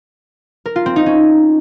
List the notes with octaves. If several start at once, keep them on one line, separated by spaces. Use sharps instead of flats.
A#4
F4
C4
D#4
C#4